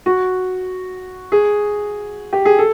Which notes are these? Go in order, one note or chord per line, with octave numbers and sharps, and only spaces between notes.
F#4
G#4
G4
G#4
A4